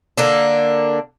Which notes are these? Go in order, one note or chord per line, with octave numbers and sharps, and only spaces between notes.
D3 A#3 D4